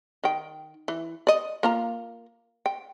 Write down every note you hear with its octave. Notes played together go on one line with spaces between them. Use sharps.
D#3 G5
E3
D5 D#5
A#3 F4 A#5
G5